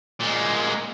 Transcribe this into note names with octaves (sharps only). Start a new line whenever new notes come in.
A#2 G#3